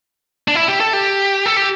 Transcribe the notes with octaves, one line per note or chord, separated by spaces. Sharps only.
D4
E4
G4
A4
G4
A4
G4